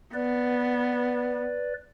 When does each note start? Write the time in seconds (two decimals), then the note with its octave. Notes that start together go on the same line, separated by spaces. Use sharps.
0.14 B3 B4 D5